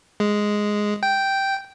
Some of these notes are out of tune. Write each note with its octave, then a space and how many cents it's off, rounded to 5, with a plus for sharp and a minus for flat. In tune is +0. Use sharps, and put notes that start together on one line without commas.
G#3 +0
G5 -5